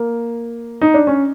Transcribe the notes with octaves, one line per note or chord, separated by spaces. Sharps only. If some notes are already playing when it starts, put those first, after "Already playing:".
Already playing: A#3
D#4
D4
C#4